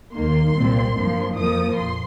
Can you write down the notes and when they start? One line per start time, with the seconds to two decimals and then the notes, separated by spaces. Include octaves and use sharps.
0.15 D#2 D#3 A#3 C6
0.55 C2 A#2 G3 C4
0.95 G1 G2 F3 A#3
1.36 F2 F3 A#3 D#6
1.76 A#1 C6